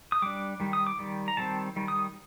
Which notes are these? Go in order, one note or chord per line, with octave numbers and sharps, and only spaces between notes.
D#6
G3 D4 D6
D#3 G3
D#6
D6
D#3 G3
A#5
D#3 G3 C4 A5
D#3 G3
D#6